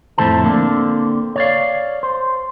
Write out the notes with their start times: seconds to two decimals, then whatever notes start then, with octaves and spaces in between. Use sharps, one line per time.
0.18 F2 A2 E3 A3 C5 A5
0.44 D3 A#3 C4 D4
1.36 C#5 D5 F5
2.03 C5